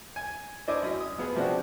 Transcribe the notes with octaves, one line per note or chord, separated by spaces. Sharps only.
G#5
D4 E4 C5 D#5 G#5 D6
F#2 D#5
D#6
F3 B3 G#4
C3 F3 C4 D4 F#4